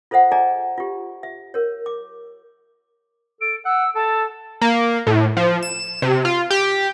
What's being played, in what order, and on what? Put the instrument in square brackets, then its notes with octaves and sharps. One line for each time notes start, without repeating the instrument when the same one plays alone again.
[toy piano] F4 A4 C5 E5 F#5
G#4 D5 D#5 G#5 A#5
F4 G4
E5
A#4 C#5
D6
[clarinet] A4 [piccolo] D7
[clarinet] F#5 [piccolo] E6
[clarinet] A4 [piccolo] A5
[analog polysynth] A#3
A2
F3
E7
C3
F4
G4